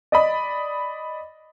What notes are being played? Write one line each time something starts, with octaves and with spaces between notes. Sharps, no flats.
D5 D#5 B5